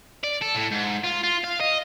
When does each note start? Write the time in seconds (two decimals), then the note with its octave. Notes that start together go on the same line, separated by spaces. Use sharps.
0.24 D5
0.42 A4
0.55 A2
0.72 G#2
1.04 F4
1.24 F4
1.44 F5
1.61 D#5